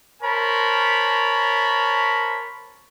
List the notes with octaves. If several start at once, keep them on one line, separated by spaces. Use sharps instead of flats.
A#4 C5 C#5 A5 B5